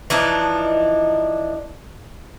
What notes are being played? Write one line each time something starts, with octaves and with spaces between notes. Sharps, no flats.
E3 F3 D4 D#4